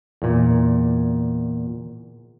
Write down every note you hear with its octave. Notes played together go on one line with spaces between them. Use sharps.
E2 A#2